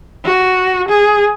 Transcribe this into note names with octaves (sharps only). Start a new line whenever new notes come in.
F#4
G#4